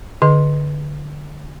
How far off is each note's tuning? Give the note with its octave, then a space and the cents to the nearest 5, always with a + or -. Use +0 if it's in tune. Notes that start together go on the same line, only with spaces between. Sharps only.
D3 +0 G#4 +15 D#5 +0